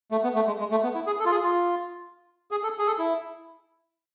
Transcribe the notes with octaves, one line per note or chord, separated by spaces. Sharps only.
A3
B3
A3
G#3
G#3
A3
B3
E4
G#4
A4
F4
G#4
F4
G#4
A4
G#4
A4
E4